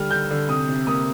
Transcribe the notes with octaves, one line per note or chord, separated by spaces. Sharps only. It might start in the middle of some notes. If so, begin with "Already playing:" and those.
Already playing: D3 G3 F6
D3 G6
D3
C3 D#6
C3
A#3 D#6